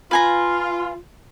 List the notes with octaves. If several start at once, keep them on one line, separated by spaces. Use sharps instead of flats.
F4 B4 G#5 A#5